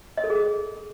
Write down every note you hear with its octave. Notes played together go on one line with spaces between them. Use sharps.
D#5
A4
G#4